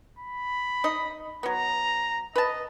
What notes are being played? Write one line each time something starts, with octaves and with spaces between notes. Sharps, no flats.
B5
D#4 D#5
F#3 B3 A#5
B4 D#5 A5